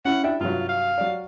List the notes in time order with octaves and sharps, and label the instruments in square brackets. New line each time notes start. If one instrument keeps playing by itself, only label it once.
[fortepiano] C#4 E4 [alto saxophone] F#5
[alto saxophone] D4 [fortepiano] E4 E5 G5
[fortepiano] G2 C3 F#3 [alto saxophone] F4
[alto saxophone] F5
[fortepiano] F#3 D5